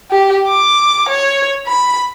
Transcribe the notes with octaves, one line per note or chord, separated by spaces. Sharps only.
G4
D6
C#5
B5